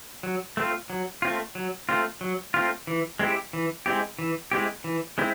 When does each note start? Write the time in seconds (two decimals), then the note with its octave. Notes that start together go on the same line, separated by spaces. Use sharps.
0.23 F#3
0.57 A3 C4 F4
0.90 F#3
1.22 A3 C4 F4
1.55 F#3
1.89 A3 C4 F4
2.21 F#3
2.54 A3 C4 F4
2.87 E3
3.19 G#3 C4 E4 G4
3.53 E3
3.86 G#3 C4 E4 G4
4.19 E3
4.52 G#3 C4 E4 G4
4.84 E3
5.18 G#3 C4 E4